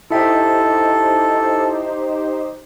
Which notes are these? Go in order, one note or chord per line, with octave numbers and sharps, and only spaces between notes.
D#4 E4 G4 A4 C5 E5 G5